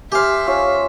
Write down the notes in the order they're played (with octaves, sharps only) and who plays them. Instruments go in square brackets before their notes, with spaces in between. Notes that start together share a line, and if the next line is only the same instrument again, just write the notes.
[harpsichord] G4 F5 [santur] C5 G#5 [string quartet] E5
[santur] C#4 F4 C5